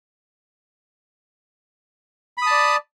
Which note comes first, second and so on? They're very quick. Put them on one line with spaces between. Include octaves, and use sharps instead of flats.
B5 D#6 A5 D5